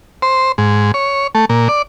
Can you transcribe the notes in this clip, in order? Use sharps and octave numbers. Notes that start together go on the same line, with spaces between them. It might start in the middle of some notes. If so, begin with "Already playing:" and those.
C5
G#2
C#5
A3
A#2
D5